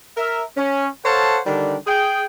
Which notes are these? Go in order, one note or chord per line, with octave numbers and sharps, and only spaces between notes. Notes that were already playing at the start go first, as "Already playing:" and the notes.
A#4 E5
C#4
A4 C5 C#5 F5 F#5 A5
D3 D#3 G3 D4
G#4 G5